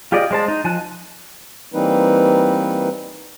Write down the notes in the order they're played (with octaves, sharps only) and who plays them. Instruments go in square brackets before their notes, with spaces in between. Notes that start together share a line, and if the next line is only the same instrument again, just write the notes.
[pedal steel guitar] F4 G4 G#4 D5 D#5
G#3 C5 A5
D#4
F3 G#5 A5 F#6
[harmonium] E3 G3 A#3 C4 D#4 B4